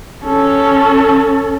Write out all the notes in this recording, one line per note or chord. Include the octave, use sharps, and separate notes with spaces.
C#4 A4